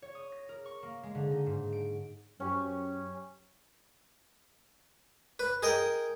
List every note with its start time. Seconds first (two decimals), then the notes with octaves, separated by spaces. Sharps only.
0.02 C#5
0.15 D#6
0.32 A#6
0.49 A#4
0.66 C#6
0.83 A#3
1.03 G#3
1.15 D3
1.31 D#4
1.46 G#2
1.72 D7
2.40 F#2 C#4 G4
5.39 B4
5.62 G#4 A#4 D#5 G5